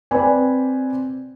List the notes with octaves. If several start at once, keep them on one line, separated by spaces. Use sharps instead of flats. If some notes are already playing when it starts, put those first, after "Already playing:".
C4 B4 D5 G#5